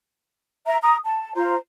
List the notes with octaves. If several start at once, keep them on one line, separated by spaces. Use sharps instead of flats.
E5 A#5
A#5 D#6
A5
F4 C5 A#5